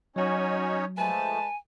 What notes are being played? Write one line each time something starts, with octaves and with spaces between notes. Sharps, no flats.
F#3 C#4 D#4 F#4 C#5 G#5
F3 G#3 A3 B4 G#5 A5